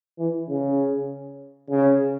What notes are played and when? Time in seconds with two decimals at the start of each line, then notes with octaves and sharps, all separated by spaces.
0.18 E3
0.49 C#3
1.70 C#3